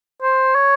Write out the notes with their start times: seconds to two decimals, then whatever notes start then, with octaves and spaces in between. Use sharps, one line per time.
0.22 C5
0.55 C#5